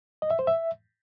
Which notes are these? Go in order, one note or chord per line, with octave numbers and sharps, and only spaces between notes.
D#5
E5
C5
E5